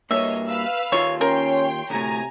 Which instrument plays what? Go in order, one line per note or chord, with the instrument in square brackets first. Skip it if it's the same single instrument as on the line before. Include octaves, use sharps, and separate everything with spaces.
[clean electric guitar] G2 A#3 [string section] C#5 D#5 [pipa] E5
[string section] B4 F5 E6
[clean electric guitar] D#2 F4 E5 [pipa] C#5
[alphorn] C#4 [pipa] A#4 [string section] C#5 G5 C6
[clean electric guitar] D2 A2 [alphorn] C3 [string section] G#5 A#5